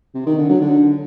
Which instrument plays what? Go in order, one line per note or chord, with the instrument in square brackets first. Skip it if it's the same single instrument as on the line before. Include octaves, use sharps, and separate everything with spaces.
[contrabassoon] C3
D#3
D3
F#3
D3